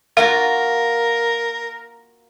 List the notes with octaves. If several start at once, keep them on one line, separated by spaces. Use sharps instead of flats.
A#3 F4 F#4 A#4 F5